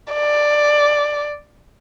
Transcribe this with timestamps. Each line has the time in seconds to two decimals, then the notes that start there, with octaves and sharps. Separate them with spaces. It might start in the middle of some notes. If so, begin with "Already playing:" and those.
0.14 D5